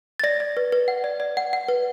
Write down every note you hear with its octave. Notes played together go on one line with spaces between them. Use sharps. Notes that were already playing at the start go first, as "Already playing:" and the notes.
A6
D5 A#6
D5
B4
B4
F#5
D5
D5
F#5
F#5
B4